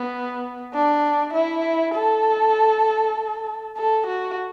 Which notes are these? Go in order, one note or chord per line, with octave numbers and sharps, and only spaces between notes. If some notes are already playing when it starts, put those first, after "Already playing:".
Already playing: B3
D4
E4
A4
A4
F#4